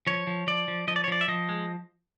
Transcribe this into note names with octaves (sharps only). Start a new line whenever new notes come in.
F3 C#5
F3
F3 D5
F3
F3 D#5
D5
C#5
F3 D5
E5
F3 D#5
G#3